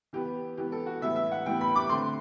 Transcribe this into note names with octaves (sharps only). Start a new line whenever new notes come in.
E3 B3 G4
E3 B3 G4
A4
F#4
A2 E3 G3 B3 E5
E5
F#5
A2 E3 G3 B3 G5
B5
D6
D3 A3 C4 C6